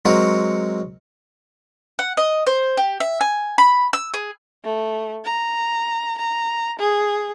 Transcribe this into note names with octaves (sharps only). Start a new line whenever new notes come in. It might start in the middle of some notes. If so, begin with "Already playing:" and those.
F#3 G#3 C4 F#4 A#4 C#5
F#5
D#5
C5
G4
E5
G#5
B5
E6
G#4
A3
A#5
A#5
G#4